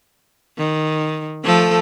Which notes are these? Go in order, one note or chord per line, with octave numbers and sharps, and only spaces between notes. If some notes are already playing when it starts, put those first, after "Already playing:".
D#3
F3 A3 A4